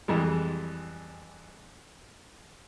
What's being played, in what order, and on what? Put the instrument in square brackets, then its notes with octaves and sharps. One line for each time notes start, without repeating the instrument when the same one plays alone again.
[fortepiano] F2 E3 G3 G#3